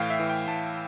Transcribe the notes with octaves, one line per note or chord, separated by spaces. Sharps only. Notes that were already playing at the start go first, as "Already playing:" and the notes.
Already playing: A2 E3 F5 G5
E5
E3
G5
A2 A5